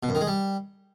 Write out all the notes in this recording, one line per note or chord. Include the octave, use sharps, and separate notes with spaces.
B2
F#2
D#3
G#3
G3